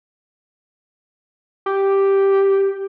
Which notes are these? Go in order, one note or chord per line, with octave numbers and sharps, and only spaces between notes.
G4